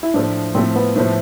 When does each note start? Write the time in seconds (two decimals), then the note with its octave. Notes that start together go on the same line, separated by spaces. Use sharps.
0.03 E4
0.14 A2 F3 A3 D4
0.55 A2 F3 A3 C4
0.76 B3
0.96 A2 F3 A3